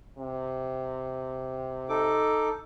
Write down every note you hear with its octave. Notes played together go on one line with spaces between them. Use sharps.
C3
D#4 A4 D6